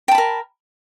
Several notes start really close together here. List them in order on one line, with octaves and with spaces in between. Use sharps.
G5 A5 B5 A#4